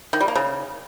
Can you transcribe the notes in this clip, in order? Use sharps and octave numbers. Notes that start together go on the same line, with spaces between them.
D#3
G3
A#3
C#3